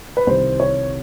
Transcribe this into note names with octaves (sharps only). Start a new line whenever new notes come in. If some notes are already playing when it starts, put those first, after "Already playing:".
B4
C2 C3 D#3 G3 C5
C#5